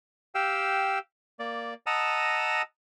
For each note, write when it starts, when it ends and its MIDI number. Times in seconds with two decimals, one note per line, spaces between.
0.35 0.99 67
0.35 0.99 77
0.35 0.99 79
0.35 0.99 88
1.39 1.74 58
1.39 1.74 74
1.86 2.62 75
1.86 2.62 78
1.86 2.62 81
1.86 2.62 82
1.86 2.62 87
1.86 2.62 88